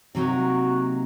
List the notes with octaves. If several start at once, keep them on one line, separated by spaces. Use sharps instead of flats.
C3 F#3 A#3 D#4 F#4 A#4